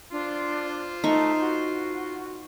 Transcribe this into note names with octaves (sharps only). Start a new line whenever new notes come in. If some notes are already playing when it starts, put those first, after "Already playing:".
D4 F4 C5
A3 D#4 C#6
F#4